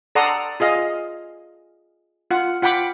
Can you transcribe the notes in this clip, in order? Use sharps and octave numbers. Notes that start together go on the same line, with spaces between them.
A4 D5 F#5 A#5 C6 D#6
F4 G#4 D#5 F5
F4 F#5
F4 F#5 G5 B5 D6